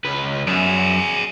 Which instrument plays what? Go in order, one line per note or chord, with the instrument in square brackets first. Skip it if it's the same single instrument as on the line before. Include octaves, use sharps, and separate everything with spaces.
[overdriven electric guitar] C#2 B4
[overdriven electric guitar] F#2 [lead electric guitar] G#4 D5